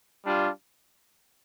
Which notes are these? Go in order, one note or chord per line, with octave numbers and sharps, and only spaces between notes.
G3 D4 F4